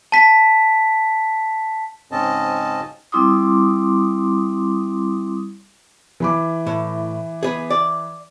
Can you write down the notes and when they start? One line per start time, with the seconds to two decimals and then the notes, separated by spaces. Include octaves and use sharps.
0.12 A5 B6
2.11 G#2 C#3 C4 C#4 D#5 A5
3.12 G3 C4 E4 C6 D6 D#6
6.20 E3 B5 D6
6.66 A2
7.43 B3 G#4
7.70 D5